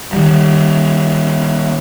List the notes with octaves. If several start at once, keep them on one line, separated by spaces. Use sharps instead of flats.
D#3 G3